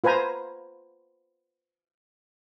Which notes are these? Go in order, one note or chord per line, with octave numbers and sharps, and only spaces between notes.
F4 B4 C5 G#5 A#5